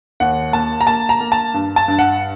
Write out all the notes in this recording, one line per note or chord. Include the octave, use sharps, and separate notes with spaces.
D#2 F#5
A#3 A5
A#5
A#3 A5
A#5
A#3
A5
G2
A5
G2
F#5